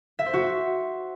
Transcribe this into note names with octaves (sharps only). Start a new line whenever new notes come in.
E5
C5
F#4